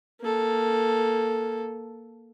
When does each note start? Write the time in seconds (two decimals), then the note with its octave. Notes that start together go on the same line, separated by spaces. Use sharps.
0.21 A#3 A4